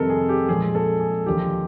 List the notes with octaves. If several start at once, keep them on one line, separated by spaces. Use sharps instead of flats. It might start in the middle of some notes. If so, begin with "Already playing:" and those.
Already playing: F2 C3 D#3 G3 C4 A4 A#4
G#4
G4
A#2 F3 G#3 C4 G#4
A4
G#4
D#2 D3 F3 A#3 G4